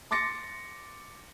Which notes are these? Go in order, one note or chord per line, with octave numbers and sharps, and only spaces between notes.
C6 D6 A6 A#6 C#7